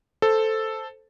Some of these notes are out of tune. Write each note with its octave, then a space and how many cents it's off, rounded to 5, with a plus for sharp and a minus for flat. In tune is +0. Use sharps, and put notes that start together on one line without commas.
A4 +0 C5 +0